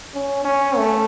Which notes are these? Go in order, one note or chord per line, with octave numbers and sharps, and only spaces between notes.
C#4
C#4
A3